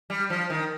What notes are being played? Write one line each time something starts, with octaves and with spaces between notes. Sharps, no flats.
G3
F3
D#3